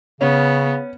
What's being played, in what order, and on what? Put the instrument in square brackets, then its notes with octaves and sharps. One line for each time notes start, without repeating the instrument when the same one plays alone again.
[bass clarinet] C#3 [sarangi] B3 [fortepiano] C#4